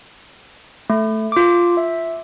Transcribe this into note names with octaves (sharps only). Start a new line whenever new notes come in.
A3
F4 D6
E5